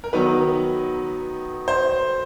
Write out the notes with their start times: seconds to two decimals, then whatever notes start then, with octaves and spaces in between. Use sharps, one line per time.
0.04 A#4
0.13 D#3 F#3 B3 B4
1.68 C5